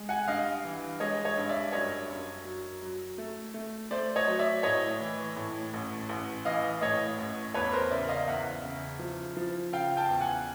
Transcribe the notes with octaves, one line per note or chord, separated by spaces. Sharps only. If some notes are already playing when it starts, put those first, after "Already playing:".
Already playing: G#3
F#5 G#5
G2 D#5 F5
E3
G#3 C#5 D#5
C#5 D#5
G2
D5 E5
F#2 C#5 D#5
F#2
F#3
F#3
A3
A3
A3 C5 D5
C#5 D#5
F#3
D5 E5
A2 C#5 D#5
E3
A2
A1
A1
E3 D#5 F5
A2 C#5 D#5
A1
E2 B4 C#5
A#4 C5
C#3 D5 E5
D#5 F5
E2 E5 F#5
C#3
F3
F3
C#3 F5 G5
G5 A5
E2
F#5 G#5